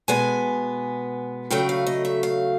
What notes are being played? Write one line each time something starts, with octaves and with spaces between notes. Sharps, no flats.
B2 G#3 B3 G#5
C#3 F#3 A3 G5
F5
D#5
E5
F5